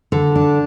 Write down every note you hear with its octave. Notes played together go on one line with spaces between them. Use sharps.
D3
D4